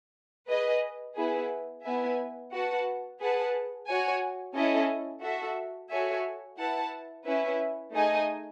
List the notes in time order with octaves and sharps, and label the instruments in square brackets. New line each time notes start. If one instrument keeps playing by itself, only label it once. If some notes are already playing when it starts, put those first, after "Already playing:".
[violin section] G#4 B4 D#5
B3 E4 G#4 B4
B3 E4 B4 E5 G#5
F#4 B4 F#5 A5
G#4 B4 F#5 A5
F#4 C#5 G#5
C#4 E4 A4 D#5
F#4 A4 E5
F#4 A4 C#5 E5 G#5
E4 B4 F#5 A5
C#4 E4 B4 E5
A3 D#4 G#4 D#5 G#5